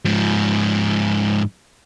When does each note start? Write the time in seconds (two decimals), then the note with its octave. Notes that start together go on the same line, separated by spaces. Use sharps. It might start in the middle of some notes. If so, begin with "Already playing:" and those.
0.05 G#2 F3